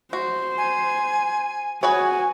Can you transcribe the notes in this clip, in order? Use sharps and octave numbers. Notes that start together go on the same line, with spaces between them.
F#4 C5
G#5
F#4 G#4 B4 C#5 G#5